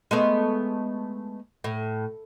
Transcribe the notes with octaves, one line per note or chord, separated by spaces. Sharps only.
G#3 A3 B3
A2